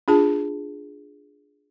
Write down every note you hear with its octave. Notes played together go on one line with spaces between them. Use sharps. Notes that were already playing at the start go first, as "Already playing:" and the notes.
D4 F4 G#4 A5